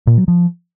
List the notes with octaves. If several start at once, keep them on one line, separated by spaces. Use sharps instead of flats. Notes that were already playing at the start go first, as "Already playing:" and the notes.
A#2
F#3
F3